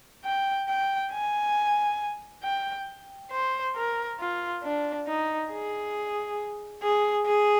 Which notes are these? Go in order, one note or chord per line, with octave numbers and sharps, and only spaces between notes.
G5
G5
G#5
G5
C5
A#4
F4
D4
D#4
G#4
G#4
G#4